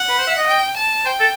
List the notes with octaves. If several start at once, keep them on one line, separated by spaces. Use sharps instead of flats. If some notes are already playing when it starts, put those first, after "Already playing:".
Already playing: F#5
B4
C5
E5
D#5
G5
A5
C5 G5
A4